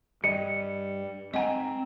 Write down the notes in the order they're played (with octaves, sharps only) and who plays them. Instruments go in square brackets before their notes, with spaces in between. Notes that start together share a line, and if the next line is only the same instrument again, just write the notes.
[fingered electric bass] G2 [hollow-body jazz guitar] G3 D#5 [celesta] C#7
[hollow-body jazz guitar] G#2 G#5 A#5 [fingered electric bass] C4 [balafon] D#5 F#5